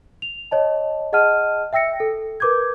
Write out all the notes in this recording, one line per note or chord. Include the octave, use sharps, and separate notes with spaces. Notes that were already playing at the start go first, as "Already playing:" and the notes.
F7
C#5 D#5 A5
G#4 D#5 F#5 A5 F6 D#7
E5 G5 E6 A#6 C#7
A4
A#4 B4 D6 G6 G#6